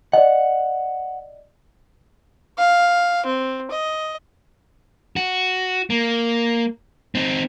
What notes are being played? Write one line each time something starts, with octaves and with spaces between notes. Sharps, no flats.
D5 D#5 F#5
F5
C4
D#5
F#4
A#3
C4 D#4